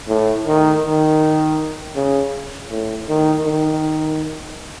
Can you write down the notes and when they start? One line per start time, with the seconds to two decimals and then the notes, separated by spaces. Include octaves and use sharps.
0.08 A2
0.46 D#3
0.84 D#3
1.96 C#3
2.71 A2
3.09 D#3
3.45 D#3